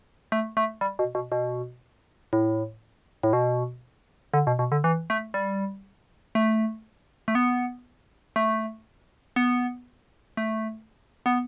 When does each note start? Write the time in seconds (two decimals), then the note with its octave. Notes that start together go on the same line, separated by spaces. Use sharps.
0.32 A3
0.57 A3
0.81 G3
0.99 B2
1.15 B2
1.32 B2
2.33 A2
3.23 A2
3.33 B2
4.34 D3
4.47 B2
4.59 B2
4.72 D3
4.84 E3
5.10 A3
5.34 G3
6.35 A3
7.28 A3
7.35 B3
8.36 A3
9.36 B3
10.37 A3
11.26 B3